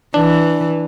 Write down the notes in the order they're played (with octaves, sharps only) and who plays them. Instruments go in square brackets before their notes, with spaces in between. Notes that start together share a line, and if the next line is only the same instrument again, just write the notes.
[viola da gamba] E3 [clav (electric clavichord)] D4